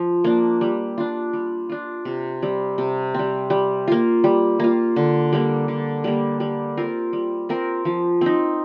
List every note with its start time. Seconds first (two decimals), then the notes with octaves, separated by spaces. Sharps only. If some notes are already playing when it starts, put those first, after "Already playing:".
Already playing: F3
0.24 A#3 D4
0.61 G3
0.98 D4 F4
1.33 G3
1.69 D4 F4
2.05 C3
2.42 G3 C4
2.78 C3
3.14 G3 C4
3.50 G3
3.88 A#3 F4
4.24 G3
4.60 A#3 F4
4.96 D3
5.33 G3 A#3
5.68 D3
6.04 G3 A#3
6.40 G3
6.77 C4 F4 A#4
7.13 G3
7.49 C4 F4 A#4
7.85 F3
8.21 C4 D#4